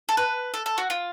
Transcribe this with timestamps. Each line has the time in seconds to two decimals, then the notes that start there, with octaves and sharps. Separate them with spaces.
0.09 A4
0.17 B4
0.54 A4
0.66 A4
0.78 F#4
0.90 F4